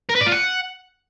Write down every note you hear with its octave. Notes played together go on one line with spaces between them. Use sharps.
A#4
B4
D5
F4
F#5